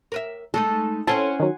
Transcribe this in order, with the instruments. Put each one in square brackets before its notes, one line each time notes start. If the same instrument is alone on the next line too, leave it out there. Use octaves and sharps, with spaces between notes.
[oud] A#4 B4 E5
[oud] G#3 A3 D#4 [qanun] A4
[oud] C4 C#4 E4 [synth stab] A4 [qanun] F#5 G#5 C6
[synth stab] D#3 F#3